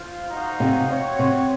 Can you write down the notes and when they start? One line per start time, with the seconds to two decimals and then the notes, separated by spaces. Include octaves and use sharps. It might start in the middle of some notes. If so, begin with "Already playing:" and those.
Already playing: F4 C5 F5
0.30 D#4 F#4 C5 F5
0.60 C3
0.89 C4 F#4 C#5
1.19 C3